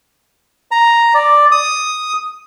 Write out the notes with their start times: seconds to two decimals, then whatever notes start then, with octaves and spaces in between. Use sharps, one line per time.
0.71 A#5
1.14 D5
1.51 D#6